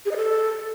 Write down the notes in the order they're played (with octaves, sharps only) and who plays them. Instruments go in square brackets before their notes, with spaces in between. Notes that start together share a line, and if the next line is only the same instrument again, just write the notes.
[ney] G#4
D#5
A4